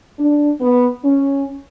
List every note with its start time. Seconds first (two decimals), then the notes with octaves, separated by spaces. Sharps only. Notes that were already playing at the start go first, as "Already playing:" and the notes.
0.19 D4
0.60 B3
1.03 C#4